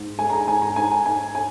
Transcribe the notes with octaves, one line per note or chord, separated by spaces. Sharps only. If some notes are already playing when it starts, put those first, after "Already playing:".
Already playing: G#2
G#3 G#5
A#5
G#5
G#2 G#5
A#5
G#2 G#5
G#5
G#2 G#5
G#5